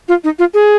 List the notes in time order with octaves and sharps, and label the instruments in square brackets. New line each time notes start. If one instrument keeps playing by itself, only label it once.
[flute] F4
D#4
F4
G#4